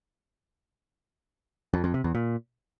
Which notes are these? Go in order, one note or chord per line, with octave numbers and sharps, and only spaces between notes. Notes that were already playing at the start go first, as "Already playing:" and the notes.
F2
F2
C3
E2
A#2